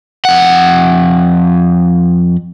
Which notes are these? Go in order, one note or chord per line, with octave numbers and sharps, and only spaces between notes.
F2 F#5